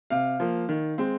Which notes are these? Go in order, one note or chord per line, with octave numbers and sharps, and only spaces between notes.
C3 F5
F3 A#3
D#3
G#3 C4